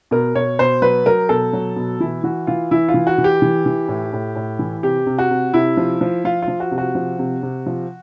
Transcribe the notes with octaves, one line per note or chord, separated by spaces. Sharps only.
B2 A#4
B2 C#5
B2 C5
F#3 B4
F#3 A#4
B2 A4
F#3
B2
E3 E4
E3 F#4
E3 F4
E3 E4
F4
E3
F#4
E3
G4
E3
E3
A2
A2
A2
E3
C3 G4
C3
F#4
C3
C3 E4
F3
F3
F3 F4
F4
F3
F#4
C3
F#4
F3
C3
C3
F3